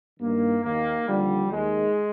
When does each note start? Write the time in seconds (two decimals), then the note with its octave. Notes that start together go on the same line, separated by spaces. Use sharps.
0.20 G2 D#3 A#3
0.63 D#2 D#3 A#3
1.07 D#2 D3 F3 G3
1.50 D#2 D#3 G#3